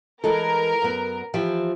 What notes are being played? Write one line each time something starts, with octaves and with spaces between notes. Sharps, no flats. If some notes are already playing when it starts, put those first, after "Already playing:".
E3 G#3 A4 A#4
F#2 B3
E3 F3 G4